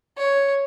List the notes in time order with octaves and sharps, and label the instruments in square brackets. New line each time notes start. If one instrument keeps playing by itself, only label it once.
[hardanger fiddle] C#5